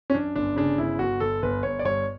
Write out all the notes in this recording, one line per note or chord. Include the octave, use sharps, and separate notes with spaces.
C#4
F#2 D4
G1 D4
C#3 D4
G1 E4
G1 F#4
G1 A4
G1 B4
G1 C#5
D5
G2 C#5